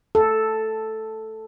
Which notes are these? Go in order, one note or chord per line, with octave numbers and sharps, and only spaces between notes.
A4